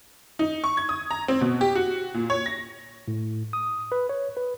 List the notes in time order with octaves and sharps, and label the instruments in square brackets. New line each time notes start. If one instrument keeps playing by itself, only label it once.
[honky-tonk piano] D#4
C#6
G#6
D#6
A#5
C4
B2
G4
F#4
A#2
C#5
A#6
[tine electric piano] A2
D#6
B4
C#5
B4